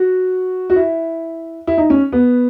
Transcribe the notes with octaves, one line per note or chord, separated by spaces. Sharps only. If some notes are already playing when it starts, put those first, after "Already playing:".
Already playing: F#4
F#4
E4
E4
D#4
C#4
B3